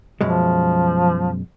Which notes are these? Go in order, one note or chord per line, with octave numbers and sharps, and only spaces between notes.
F#2 B2 F3 G#3